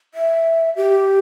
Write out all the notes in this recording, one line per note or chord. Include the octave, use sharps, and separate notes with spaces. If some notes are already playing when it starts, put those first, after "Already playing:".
E5
G4